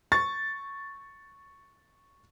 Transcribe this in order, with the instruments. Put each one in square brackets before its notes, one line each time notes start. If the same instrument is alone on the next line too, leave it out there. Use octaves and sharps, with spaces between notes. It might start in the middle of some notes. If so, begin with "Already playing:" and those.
[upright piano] C#6 A6